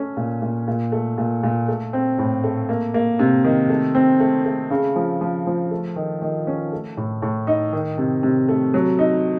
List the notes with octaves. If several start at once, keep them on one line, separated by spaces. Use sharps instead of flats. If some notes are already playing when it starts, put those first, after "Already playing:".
Already playing: A3 C#4
A#2
A#2
A#2
A3
A#2
A#2
A3
C4
A2
A3
A#3
A#3
C3
D#3
A3
C4
A3
A3
C#3
F3
F3
F3
A3
D#3
D#3
C#4
A3
A2
A2
D#4
D#3
C3
C3
A3
F#3
D#4